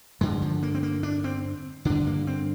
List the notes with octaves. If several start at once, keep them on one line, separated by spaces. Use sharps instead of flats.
G2 D3 G#3
F3
A#3
C4
A#3
D4
C4
G2 D3 D4
A#3
C4